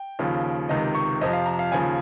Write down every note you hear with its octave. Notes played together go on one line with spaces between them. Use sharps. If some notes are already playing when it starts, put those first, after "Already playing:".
Already playing: G5
D#2 C#3 F3
C#2 C3 D#3 D#5
C#6
F2 C3 F3 D#5
F5
A#5
F5
D#2 C#3 F3 G#5